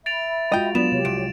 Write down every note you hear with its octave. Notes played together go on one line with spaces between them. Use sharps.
E5 B5 A6 D7 F7
G#3 F4 F#4 D#5 G5
F#3 B3 D4 F4 D5 E7
C3 F#4 G4 C#5
C2 D7